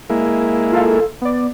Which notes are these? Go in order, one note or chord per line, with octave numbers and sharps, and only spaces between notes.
G#3 A#3 E4
F4 A4 F5
B3 D5